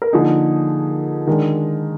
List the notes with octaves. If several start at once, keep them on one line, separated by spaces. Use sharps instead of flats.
A#4
D3 F3 A#3 D#4 G#4
D#3 G#3 D4